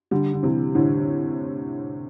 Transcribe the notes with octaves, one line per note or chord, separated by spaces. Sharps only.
D3 G3
D3
C3 E3
A2 D3